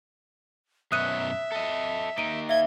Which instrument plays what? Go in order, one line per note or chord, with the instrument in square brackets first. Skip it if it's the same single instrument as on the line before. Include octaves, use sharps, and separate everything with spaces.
[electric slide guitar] F#2 B2 C#5 [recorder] E5 [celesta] D#6 F#6 D#7
[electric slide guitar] A4 D#5
[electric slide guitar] A#3 D#4 [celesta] D7 D#7
[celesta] E5 F5 G7 [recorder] G#6